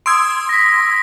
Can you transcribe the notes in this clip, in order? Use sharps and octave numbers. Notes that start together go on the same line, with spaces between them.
C6 D#6 E6 G#6 D7
A#6 B6